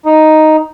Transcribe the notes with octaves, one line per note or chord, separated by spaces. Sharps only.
D#4